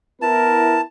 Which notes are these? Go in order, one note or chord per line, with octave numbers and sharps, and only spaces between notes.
B3 E4 A#4 A5